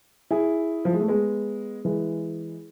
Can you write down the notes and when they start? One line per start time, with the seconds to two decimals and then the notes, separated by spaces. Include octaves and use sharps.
0.31 E4 G#4
0.85 F3
0.93 G#3
1.01 A3
1.08 G#3 B3
1.85 E3 G#3